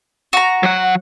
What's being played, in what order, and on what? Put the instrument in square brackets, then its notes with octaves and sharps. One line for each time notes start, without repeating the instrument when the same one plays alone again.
[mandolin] F#4 A#5
[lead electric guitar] F#3 F#5